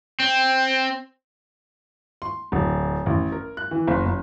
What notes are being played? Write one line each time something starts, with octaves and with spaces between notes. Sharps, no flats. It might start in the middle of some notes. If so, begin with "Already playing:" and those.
C4
C6
D1
A1
A#4
F#6
E3
F#1
F#1